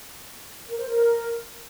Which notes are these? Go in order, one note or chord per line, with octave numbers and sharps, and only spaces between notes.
A#4
C5
A#4